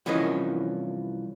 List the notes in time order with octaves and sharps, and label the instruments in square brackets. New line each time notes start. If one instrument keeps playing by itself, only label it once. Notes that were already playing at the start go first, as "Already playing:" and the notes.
[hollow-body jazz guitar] C2 E3 F3 C#4 A#4 D#5